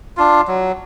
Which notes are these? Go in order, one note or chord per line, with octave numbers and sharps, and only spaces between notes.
D4 F4
F#3